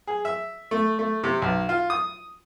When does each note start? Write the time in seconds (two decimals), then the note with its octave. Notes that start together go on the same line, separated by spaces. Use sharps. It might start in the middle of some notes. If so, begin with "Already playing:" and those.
0.07 G#4
0.25 E5
0.71 A3
0.99 A3
1.24 C3
1.42 B1
1.69 F4
1.90 D#6